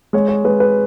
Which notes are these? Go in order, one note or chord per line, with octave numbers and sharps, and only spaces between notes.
G#3 C#5
C#5
G#3 B4
B4